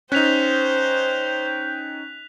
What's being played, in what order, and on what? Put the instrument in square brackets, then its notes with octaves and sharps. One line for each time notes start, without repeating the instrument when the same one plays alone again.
[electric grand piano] C#4 D#4 [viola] C5 [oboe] G5 [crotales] F#6 B6 F7